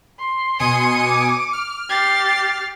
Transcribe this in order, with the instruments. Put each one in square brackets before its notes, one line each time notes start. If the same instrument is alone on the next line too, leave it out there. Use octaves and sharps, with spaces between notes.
[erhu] C6
[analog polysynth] B2 G#5 D#6 [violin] C#7 D#7
[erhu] D6
[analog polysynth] F6
[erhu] G4 [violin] A6 C7